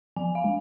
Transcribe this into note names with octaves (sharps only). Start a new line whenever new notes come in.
F3 G#5
F5
G#3